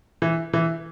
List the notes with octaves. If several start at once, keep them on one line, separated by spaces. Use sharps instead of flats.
E3
E3